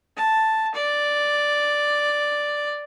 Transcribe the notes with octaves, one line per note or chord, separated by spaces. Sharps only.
A5
D5